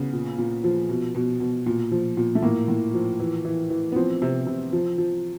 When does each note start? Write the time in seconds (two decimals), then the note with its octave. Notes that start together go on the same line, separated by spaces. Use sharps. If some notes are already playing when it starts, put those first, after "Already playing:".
Already playing: C#3 B3
0.13 A#2
0.38 A#2
0.64 F3
0.89 B2
1.15 B2
1.40 B2
1.66 A#2
1.91 F3
2.17 A#2
2.35 A3
2.42 A2 A#3
2.68 A2
2.94 F3
3.20 E3
3.45 E3
3.70 E3
3.92 B3
3.96 F3 C4
4.22 C3
4.47 C3
4.72 F3
4.98 F3